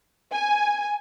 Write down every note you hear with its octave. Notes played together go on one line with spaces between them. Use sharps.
G#5